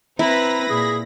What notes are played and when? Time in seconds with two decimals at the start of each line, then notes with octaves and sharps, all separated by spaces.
0.19 C4 E4 B4 A#5 B5 A#6
0.70 A#2 G#4